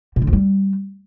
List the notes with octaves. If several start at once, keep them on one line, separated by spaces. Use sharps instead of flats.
A#2
D3
F2
G3